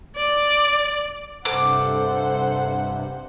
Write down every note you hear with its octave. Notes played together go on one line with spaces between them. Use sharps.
D5
G2 C3 A4 C5 F#5 D6